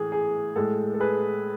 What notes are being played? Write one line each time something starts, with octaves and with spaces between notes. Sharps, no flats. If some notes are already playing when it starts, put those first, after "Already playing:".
Already playing: A2 E3 G#4
G#4
A2 G#3 A4
A4
G#4 B4